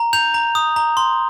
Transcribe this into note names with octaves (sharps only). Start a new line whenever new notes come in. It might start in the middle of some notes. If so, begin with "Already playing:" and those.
Already playing: A#5
G6 F7
A#5
D#6
A#5
C6